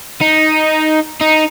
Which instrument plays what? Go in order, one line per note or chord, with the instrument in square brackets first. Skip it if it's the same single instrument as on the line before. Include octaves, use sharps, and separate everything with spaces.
[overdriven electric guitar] D#4
D#4